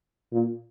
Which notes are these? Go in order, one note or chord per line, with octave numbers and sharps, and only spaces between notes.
A#2